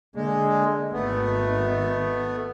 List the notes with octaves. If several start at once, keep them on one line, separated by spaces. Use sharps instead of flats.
D3 G#3 A#3
G#1 D#3 A3 B3